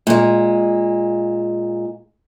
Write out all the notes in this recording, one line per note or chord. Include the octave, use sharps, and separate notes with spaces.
A#2 G#3